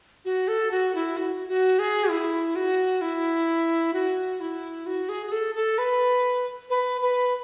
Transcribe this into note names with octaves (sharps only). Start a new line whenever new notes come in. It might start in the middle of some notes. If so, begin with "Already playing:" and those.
F#4
A4
F#4
E4
F#4
F#4
G#4
E4
F#4
E4
F#4
E4
F#4
G#4
G#4
A4
A4
B4
B4
B4